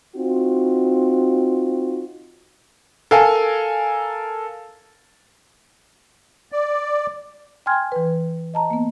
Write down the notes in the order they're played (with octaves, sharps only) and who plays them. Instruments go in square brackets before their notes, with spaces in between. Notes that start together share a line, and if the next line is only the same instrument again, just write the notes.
[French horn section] C4 D#4 F4 F#4
[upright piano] A4 A#4 F5 G#5
[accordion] D5
[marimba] G5 G#5 C6 F6 G#6
E3 B4
D#5 A5 A#5
A#3 B3